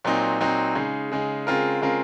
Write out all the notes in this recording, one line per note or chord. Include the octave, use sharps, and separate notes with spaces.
A#2 F#3 C4 D#4
A#2 F#3 C4 D#4
C#3 G#3 D#4
C#3 G#3 D#4
C#3 G#3 C4 F4 A#4
C#3 G#3 C4 F4 A#4